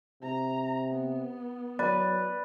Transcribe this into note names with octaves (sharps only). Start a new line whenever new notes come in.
C3 A#5
B3
F#3 B4 D5